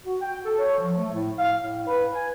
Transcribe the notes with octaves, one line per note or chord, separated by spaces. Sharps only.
F#4
G5
A4
C#5
F3
A3
A2
F5
A2
B4
G#5